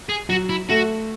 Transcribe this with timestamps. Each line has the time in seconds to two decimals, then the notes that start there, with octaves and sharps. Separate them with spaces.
0.09 G#4
0.29 F#3 F#4
0.49 E4
0.69 A3 F#4